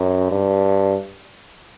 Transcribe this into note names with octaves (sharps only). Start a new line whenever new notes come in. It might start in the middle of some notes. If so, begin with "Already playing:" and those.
Already playing: F#2
G2